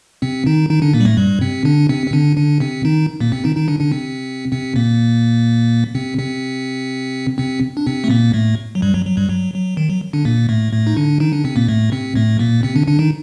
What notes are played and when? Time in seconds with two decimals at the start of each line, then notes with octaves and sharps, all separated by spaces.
0.22 C3 C4
0.46 D#3 D#4
0.69 D#3 D#4
0.82 D3 D4
0.94 A#2 A#3
1.00 G3
1.05 A2 A3
1.17 G2 G3
1.41 C3 C4
1.65 D3 D4
1.89 C3 C4
2.07 C4
2.13 D3 D4
2.37 D3 D4
2.60 C3 C4
2.85 D#3 D#4
3.21 A#2 A#3
3.32 C3 C4
3.44 D#3 D#4
3.56 D#3 D#4
3.68 D3 D4
3.80 D3 D4
3.92 C3 C4
4.52 C3 C4
4.76 A#2 A#3
5.95 C3 C4
6.19 C3 C4
7.38 C3 C4
7.77 D4
7.87 C3 C4
8.04 A3
8.10 A#2 A#3
8.33 A2 A3
8.75 F#3
8.82 G2 G3
8.94 F#3
9.06 F#3
9.17 G2 G3
9.29 F#3
9.54 F#3
9.77 D#3
9.90 F#3
10.13 D3 D4
10.25 A#2 A#3
10.49 A2 A3
10.73 A2 A3
10.87 D#4
10.97 D3 D4
11.20 D#3 D#4
11.33 D3 D4
11.44 C3 C4
11.56 A#2 A#3
11.68 A2 A3
11.92 C3 C4
12.16 A2 A3
12.39 A#2 A#3
12.63 C3 C4
12.76 D3 D4
12.87 D3 D4
12.99 D#3 D#4